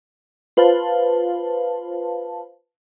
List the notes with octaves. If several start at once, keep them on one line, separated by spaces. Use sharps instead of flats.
F4 B4 C5 F5 A5